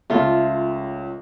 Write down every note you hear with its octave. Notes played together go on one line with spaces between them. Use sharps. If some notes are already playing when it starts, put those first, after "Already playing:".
C#2 A3 F4